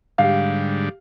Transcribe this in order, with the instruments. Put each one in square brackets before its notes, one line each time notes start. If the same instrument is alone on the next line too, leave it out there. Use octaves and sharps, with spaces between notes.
[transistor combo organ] G#2 D3 G3 [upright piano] G4 F5